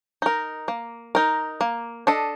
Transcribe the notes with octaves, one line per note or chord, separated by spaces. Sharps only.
D#4 A#4
A#3
D#4 A#4
A#3
D4 A4 D#5